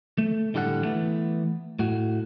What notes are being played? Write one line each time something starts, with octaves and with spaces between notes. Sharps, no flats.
A3
A2 D3 G3 A4 F#5
E3 A3 B3
A2 F#4